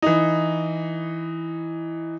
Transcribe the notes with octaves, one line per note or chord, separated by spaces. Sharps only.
E3 D#4